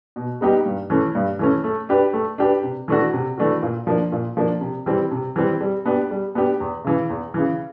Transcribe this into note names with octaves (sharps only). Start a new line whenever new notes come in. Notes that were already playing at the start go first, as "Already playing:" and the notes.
B2
G3 B3 D#4 G4
G2
E3 A3 C#4
G2
E3 A3 C#4
A3
D4 G4 B4
A3
D4 G4 B4
C3
E3 A3 D4 F#4
C3
E3 A3 D4 F#4
A#2
F3 A#3 D4
A#2
F3 A#3 D4
C3
E3 G3 C4
C3
E3 G3 C4
G3
B3 D4 G4
G3
B3 D4 G4
E2
C#3 E3
E2
C#3 E3